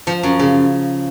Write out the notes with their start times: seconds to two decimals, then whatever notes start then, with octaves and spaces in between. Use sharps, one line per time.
0.07 F3
0.23 F#2
0.39 C#3